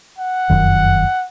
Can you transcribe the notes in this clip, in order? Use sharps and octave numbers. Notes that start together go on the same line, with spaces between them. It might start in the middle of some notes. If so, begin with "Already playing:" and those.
F#5
F1 F#2 D#3